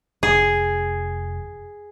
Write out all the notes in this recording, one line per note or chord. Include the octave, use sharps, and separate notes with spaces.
F1 G#4